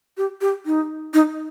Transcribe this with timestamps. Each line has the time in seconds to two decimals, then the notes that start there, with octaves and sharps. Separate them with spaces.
0.17 G4
0.41 G4
0.66 D#4
1.13 D#4